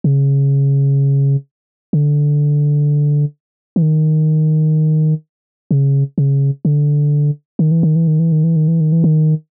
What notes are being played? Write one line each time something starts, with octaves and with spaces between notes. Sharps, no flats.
C#3
D3
E3
D#3
C#3
C#3
D3
D#3
E3
D#3
E3
D#3
E3
D#3
E3
D#3
E3
D#3
E3
D#3